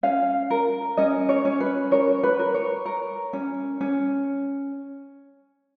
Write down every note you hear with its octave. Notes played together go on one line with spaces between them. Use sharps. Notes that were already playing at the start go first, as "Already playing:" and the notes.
C#4 F5
A#4
C#4 D#5
C#5
C#4
B4
A#4 C#5
B4
A#4
C#5
A#4
C#4
C#4